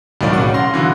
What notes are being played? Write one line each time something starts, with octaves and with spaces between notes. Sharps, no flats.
B1 A2 D#3 F#3 D5 F5
C#3 C#4 F#5
F5 C6 A#6
B2 D3 E3